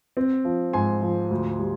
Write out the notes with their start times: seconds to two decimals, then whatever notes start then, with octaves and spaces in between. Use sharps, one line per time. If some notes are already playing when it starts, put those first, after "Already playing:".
0.17 C4
0.45 F3
0.73 G#2 G#5 C6
1.02 F3
1.31 D2
1.59 G3